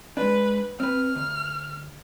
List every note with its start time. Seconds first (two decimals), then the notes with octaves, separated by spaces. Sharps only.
0.17 G#3 D4 B4
0.80 C4 B4 F6
1.15 D2